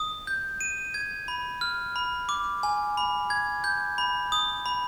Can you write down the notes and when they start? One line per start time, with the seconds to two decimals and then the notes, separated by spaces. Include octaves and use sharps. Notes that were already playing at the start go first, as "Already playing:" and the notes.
Already playing: D#6
0.27 G6
0.61 D#7
0.94 G#6
1.28 B5
1.61 F6
1.96 B5
2.29 D6
2.63 G#5
2.97 B5
3.30 G#6
3.64 G6
3.98 B5
4.32 D#6
4.66 B5